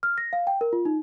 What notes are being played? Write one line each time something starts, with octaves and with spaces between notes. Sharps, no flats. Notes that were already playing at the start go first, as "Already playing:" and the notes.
F6
A#6
F5
G5
A#4
F4
D#4